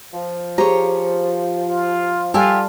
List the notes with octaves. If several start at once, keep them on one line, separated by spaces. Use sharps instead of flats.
F3
G4 G#4 C5 C#5 A#5
F4
G3 F4 G4 A4 E5 G#5